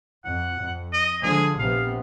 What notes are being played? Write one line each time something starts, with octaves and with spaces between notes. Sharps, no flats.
F2 F#5
F2
D#5
D3 F3 G#3 G#4
A#1 C3 B3 F5